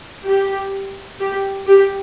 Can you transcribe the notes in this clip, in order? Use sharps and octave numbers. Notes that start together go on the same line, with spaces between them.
G4
G4
G4